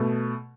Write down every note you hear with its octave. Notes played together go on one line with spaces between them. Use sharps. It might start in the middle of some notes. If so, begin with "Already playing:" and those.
Already playing: B2 A3